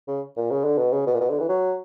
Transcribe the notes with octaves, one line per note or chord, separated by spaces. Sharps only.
C#3
A#2
C#3
D3
B2
C#3
B2
A#2
B2
D3
E3
F#3